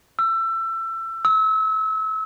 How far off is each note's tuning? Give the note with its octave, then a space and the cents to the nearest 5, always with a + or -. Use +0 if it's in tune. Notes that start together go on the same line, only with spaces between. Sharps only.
E6 +25
E6 -30